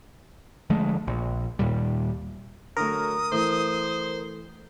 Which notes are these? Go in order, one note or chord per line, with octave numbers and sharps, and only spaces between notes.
D3 F3 G#3 A3
A#1
D#2 A#2 G3
D3 F#3 A3 A#4 D#6
E3 A3 C5